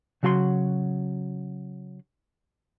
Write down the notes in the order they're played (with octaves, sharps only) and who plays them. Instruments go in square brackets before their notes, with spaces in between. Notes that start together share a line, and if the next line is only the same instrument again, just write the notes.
[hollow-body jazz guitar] C#3 F#3 F#4 F#5 C6